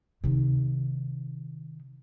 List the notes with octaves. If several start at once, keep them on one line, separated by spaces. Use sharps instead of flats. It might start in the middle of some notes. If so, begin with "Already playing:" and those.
C3 D#3